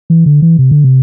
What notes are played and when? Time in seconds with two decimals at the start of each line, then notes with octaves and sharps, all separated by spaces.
0.10 E3
0.26 D3
0.42 E3
0.59 C3
0.71 D3
0.84 C3